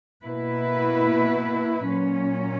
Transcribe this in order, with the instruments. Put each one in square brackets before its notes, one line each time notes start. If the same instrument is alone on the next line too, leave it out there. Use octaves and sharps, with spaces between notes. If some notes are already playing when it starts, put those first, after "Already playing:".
[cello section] B2 A#3 E4 B4
A#2 F#3 C#4